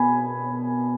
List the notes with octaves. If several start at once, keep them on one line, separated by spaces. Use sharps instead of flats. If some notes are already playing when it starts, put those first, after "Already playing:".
Already playing: B2 G#5 B5